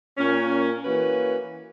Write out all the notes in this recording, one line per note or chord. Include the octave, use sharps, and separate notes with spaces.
A#2 A#3 C#4
E3 A#3 C#4 F#4 B4